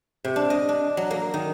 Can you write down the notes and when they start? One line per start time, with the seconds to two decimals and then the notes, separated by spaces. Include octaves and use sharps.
0.25 C3
0.36 D4
0.50 D#5
0.69 D4
0.97 F#3
1.11 A#3
1.34 D#3